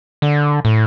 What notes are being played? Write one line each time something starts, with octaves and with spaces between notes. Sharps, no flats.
D3
A2